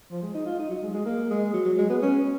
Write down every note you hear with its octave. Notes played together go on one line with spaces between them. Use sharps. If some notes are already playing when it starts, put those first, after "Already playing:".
F3
G#3
D#4
F4
D#4
F#3
G#3
G#3
A#3
G#3
F#3
F#3
G#3
B3
C#4